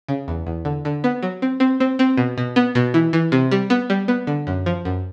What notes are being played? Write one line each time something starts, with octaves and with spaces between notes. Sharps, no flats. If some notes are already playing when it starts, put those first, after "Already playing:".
C#3
E2
E2
D3
D3
B3
F#3
C4
C4
C4
C4
B2
B2
B3
B2
E3
E3
C3
G3
B3
G3
B3
D3
F#2
F3
F#2